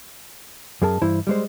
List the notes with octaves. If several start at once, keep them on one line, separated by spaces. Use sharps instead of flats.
F#2 G#4 A#4 A5
G2 E3 E4 C5
G3 G#3 C5